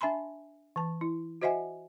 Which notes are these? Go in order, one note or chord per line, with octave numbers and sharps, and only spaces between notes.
D4 E5 G#5 B5 C6
E3 A5
E4
F#4 C5 D#5 E5 F#5 G#5